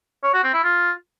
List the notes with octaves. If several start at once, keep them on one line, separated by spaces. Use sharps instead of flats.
C#5
F#4
C4
E4
F4